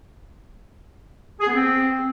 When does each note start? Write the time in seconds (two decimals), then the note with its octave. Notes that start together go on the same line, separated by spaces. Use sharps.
1.40 G#4
1.47 B3
1.55 C4